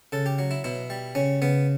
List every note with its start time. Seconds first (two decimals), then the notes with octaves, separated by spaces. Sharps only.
0.12 C#3 A4
0.26 G4
0.39 F#3
0.51 E4
0.64 B2 E4
0.90 G3
1.15 C#3 C#4
1.42 C#3 B3